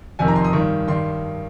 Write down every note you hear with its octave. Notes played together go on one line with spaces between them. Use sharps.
F2 C3 D#3 G#5
A#5
C6
D#6
G2 D#3 C#6
G2 D#3 C6